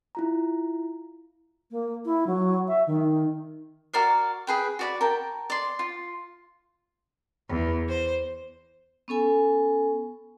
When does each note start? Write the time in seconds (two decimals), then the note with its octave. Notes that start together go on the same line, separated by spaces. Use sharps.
0.15 E4 F4 A#5
1.71 A#3
2.05 E4
2.27 F#3
2.67 E5
2.87 D#3
3.93 F#4 A#4 D5 F5
4.47 G#4 B4 G5
4.79 F#4 D5 B5
5.01 A#4 G5 A5
5.50 D5 C6
5.79 F4
7.50 E2
7.89 C5
9.08 B3 C#4 A4 G#5